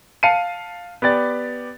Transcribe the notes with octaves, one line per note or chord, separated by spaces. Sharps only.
F5 A5 C7 C#7 D#7
B3 G4 D5 A6